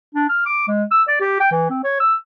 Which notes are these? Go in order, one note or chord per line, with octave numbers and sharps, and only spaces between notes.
D4
F6
D6
G#3
E6
D5
G4
G5
E3
C4
C#5
E6